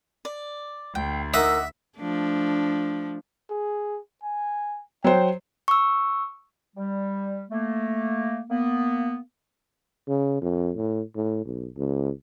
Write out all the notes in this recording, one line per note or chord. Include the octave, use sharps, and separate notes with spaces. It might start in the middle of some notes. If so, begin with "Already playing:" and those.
D5
D2 G5
D#4 A#4 D#5 E5 F#5 D6 E6
F3 A3 D4
G#4
G#5
F#3 C5 G5
C#6 E6
G3
A3 A#3
A#3 B3
C#3
F2
A2
A2
B1
C#2